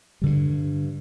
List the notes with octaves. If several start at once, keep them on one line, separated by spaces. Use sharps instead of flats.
G2 D3 G3